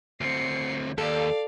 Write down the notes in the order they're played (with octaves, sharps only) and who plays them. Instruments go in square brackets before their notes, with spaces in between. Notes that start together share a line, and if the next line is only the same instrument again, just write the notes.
[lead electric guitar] D2 C4 [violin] C7 C#7
[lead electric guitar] D#2 [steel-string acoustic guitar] A4 [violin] D5 F5